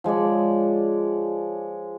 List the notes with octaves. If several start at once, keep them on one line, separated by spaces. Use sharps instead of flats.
F3 G#3 C#5 D5